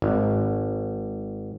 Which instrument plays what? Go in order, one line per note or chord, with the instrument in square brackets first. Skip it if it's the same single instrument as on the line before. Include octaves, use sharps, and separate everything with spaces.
[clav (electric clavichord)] G#1